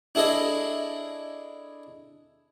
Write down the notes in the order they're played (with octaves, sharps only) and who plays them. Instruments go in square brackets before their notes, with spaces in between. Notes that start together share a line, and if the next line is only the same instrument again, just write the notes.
[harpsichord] D4 E4 G#4 A4 D#5